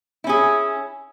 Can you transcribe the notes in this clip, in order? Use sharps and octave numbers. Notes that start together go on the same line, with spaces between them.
C#4 E4 G#4